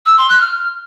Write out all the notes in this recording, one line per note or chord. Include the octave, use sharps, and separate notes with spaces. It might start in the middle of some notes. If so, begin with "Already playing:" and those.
E6
C6
F#6
F6